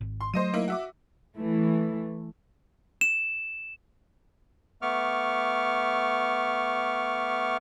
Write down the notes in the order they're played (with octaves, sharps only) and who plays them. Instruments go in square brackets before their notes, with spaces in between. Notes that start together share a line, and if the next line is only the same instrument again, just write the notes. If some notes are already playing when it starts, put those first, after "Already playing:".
[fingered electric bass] G#1
[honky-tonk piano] C6
[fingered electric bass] F#3 A3 [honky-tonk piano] C5 D#5 D#7
[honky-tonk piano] A#3 D#4 E4
F#4 E5 D6
[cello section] E3 A3
[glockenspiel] E7
[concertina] A3 B3 C#6 D6 F6